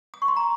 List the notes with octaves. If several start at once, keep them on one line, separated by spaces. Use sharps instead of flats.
D#6
C#6
C6
A#5